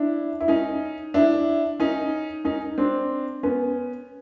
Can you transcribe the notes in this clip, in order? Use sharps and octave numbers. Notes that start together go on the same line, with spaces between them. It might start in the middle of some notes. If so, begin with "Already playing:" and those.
Already playing: D4 E4
E4
C#4 D#4
D4 E4
C#4 D#4
C#4 D#4
C4 D4
B3 C#4